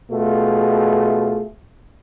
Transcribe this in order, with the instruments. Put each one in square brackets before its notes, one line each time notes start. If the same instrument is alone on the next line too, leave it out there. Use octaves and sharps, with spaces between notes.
[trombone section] B2 A3 F4 G#4